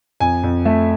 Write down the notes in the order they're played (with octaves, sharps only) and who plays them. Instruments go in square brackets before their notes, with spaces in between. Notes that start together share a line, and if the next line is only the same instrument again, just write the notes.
[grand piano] F2 G#5
F2
A3 E5